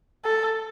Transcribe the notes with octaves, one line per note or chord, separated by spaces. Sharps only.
A4